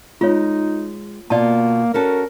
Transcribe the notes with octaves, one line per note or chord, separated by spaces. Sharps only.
G#3 D#4 F4 C#5
B2 A#3 F4 D5 A5
C#4 F#4 A4 A#4